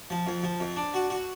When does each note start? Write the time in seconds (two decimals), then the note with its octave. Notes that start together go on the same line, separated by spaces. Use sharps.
0.10 F3
0.27 F2
0.43 F3
0.60 F2
0.76 D4
0.94 F#4
1.10 F#4